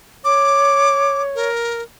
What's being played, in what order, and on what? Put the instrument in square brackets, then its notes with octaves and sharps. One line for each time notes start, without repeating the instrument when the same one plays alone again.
[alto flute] C#5 [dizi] D6
[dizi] A#4